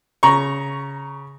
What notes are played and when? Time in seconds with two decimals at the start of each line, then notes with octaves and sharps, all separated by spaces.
0.23 C#3 A#5 C#6